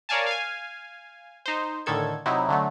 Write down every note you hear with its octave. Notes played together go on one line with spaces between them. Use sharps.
A#4 C#5 D5 F5 G#5 A5
F5 G#5
D#4 C5
A2 D3 D#3 A4 G#6
C3 F#3 D#4 E4
D3 F#3 A3